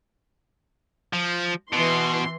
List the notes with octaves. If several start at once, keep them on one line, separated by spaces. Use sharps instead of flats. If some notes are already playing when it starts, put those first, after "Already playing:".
F3
B2 E3 C6